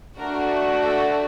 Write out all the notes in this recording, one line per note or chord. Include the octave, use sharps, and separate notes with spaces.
A3 D4 F#4 A#4
A4